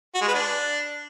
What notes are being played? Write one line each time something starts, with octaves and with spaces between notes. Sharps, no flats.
F#4
G#3
B4
D4